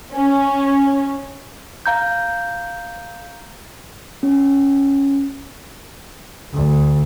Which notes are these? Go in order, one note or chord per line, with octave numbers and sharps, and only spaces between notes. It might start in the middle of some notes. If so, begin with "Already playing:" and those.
C#4
F5 A#5 G6
C#4
D2